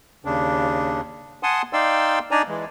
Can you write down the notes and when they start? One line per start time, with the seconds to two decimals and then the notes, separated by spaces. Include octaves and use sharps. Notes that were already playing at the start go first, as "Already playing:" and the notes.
0.25 D#2 C#3 D4
1.43 F#5 G#5 A5 C6 D#6
1.73 D#4 D5 F5 G5 C6 E6
2.31 D4 D#4 D5 G#5 A#5
2.48 E3 G#3